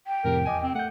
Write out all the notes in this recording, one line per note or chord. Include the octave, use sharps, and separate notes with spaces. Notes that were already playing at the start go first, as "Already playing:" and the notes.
G5
F2 A2 C3 A#4
E2 D#5 G#5 D6
C4
A3 F#5 G6